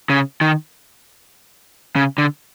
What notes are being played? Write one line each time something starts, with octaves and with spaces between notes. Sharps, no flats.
C#3
D#3
C#3
D3